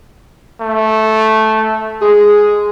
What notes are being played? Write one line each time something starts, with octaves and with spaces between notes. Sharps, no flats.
A3
G#3 G#4